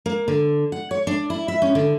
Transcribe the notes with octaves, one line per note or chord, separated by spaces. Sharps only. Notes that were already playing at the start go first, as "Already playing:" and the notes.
A#3
D3
F#5
C#5
D4
E4
E5
C#4
D3